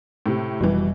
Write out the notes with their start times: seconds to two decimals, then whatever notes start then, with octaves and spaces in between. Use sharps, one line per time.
0.26 A2 C3
0.60 F1 G#2 B2 E3 G3